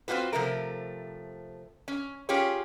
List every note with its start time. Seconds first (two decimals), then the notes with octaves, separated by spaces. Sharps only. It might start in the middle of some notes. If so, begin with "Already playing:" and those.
0.08 C4 C#4 F4 F#4 B4
0.33 C3 F3 A3 A#4
1.88 C#4
2.29 C#4 F4 G4 G#4 C#5